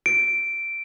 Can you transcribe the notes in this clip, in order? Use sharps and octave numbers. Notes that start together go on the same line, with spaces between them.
D7